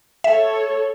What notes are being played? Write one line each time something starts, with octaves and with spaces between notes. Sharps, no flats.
A4 C#5 E5